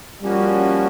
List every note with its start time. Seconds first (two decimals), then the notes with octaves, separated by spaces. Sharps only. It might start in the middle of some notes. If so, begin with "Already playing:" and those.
0.22 F3 G3 A#3 C#4 F#4